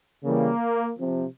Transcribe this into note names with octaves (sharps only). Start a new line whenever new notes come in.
C#3 E3 G3 A#3
C3 F3